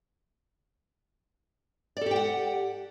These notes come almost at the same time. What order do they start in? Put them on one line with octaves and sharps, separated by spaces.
D5 A4 G4 G5 F#5